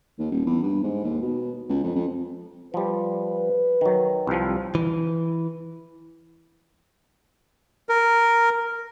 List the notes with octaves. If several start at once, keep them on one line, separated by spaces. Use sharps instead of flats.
D#2
D#1
E2
G2
G#2
D#2
B2
C#2
F2
F2
F3 G3 B4
D#3 F#3
C2 F3 G3
E3
A#4